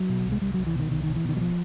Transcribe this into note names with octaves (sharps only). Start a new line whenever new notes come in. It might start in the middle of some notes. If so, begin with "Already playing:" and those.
Already playing: F#3
B2
C2
G#3
C2 G3
C2 F#3
E3
B2 D#3
C2 D#3
B2 D#3
E3
B2 D#3
F#3
F3